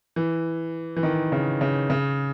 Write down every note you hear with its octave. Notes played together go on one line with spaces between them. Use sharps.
E3
E3
D#3
C#3
C#3
C#3